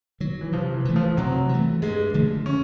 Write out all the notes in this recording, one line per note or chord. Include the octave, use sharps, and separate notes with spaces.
D#3 F#3
E3
C3 F3
E3
E3 A3
F3
C3 F#3
E3 A3
G2 G#3
D3 F3 A3
C#4